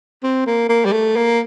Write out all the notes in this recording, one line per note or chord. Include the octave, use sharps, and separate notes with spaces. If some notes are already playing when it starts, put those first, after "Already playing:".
C4
A#3
A#3
G3
A3
A#3